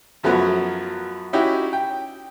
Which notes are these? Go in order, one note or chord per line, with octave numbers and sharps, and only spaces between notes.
F#2 F3 F#3 A3 B3 F#4
C#4 D#4 E4 F#4 G4
G5